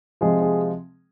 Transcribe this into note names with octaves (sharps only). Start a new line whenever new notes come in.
C3 F3 G#3 G#4
G#4